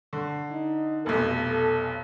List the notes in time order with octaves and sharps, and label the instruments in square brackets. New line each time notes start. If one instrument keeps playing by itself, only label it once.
[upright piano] D3
[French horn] D#4
[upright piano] F1 B1 [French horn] A4